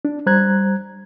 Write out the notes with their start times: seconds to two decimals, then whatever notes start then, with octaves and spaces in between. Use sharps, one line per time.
0.05 D4
0.26 G3 C5 A#5 F#6 G#6